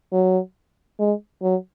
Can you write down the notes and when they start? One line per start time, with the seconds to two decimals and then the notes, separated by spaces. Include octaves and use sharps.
0.12 F#3
0.99 G#3
1.42 F#3